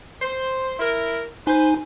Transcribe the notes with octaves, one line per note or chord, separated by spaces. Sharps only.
C5
E4 A#4
D#4 B4 C5 G#5